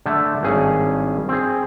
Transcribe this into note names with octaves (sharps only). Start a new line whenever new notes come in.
D3 A3 A5
G#1 G2 C#4 G#4
C4 G#4